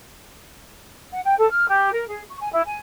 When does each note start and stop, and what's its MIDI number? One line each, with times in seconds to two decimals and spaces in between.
1.12 1.20 78
1.24 1.34 79
1.38 1.48 69
1.50 1.65 89
1.67 1.92 67
1.92 2.06 70
2.08 2.22 68
2.29 2.37 85
2.41 2.51 80
2.52 2.62 64
2.65 2.80 80